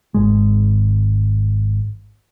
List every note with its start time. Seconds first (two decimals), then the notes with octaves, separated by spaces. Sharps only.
0.14 G#1 G#3